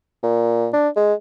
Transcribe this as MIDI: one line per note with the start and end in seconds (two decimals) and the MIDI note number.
0.23 0.68 46
0.73 0.89 62
0.96 1.14 56